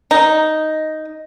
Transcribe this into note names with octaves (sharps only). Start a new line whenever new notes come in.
D#4